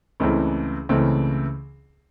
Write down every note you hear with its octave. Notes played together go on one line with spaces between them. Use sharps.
C#2 C#3 E3 A3 C4
C#2 C#3 E3 A3 C4